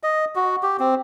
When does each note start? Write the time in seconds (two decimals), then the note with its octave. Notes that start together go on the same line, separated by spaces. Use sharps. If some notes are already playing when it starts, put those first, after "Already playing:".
0.03 D#5
0.35 F#4
0.63 G4
0.79 C4